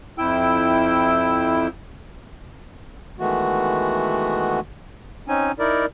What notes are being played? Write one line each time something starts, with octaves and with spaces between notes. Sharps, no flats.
F2 E4 G5 E6
D#3 E3 G#3 A3 B3 F#4
C4 C#4 D#4 G#5
D#4 E4 A#4 D5